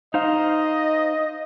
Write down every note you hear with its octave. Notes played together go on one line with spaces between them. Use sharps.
D#4 C5 D#5 F5